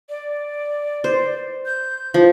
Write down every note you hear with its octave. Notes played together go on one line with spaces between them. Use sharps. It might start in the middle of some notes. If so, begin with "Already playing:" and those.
D5
C5
G6
F3